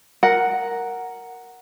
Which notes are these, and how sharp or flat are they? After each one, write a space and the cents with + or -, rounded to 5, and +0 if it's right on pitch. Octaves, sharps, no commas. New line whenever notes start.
A#4 +0 F#5 +0